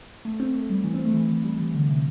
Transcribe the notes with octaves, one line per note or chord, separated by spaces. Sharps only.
A3
C4
A3
G3
E3
C4
A3
E3
E3
G3
E3
D3
C3